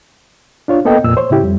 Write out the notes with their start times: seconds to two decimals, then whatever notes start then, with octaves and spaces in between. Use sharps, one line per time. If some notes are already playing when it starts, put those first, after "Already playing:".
0.68 D4 F4 C#5
0.85 A#3 B3 A4 D#5 G5
1.04 F2 A#2 E6
1.17 C5 C#5
1.30 A2 C#3 E4 G4
1.43 F2 G3